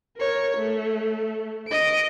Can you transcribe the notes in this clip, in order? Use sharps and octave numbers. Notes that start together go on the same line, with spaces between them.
A#4 C#5
A3
D#5 D7